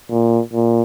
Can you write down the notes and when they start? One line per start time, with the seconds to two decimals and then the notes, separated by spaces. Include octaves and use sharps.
0.10 A#2
0.53 A#2